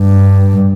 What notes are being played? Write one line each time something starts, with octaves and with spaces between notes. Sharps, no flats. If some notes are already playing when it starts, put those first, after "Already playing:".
Already playing: G2